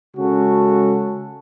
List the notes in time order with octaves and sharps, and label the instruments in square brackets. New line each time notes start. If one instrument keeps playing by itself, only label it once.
[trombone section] C#3 G#3 C#4 F#4 A4